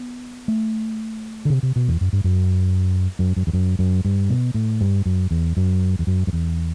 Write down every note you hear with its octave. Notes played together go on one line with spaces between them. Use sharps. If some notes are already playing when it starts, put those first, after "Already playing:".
Already playing: B3
A3
D3
C3
C3
B2
E2
F#2
G2
F#2
F#2
F#2
E2
F#2
F#2
G2
B2
A2
G2
F#2
E2
F#2
E2
F#2
F#2
E2